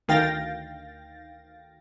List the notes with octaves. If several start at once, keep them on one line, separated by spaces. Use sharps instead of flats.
D2 D#3 F5 G5 A6 A#6